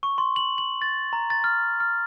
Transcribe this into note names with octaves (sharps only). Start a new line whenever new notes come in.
C#6
C6
F#7
F#7
A6
A#5
A6
F6
F6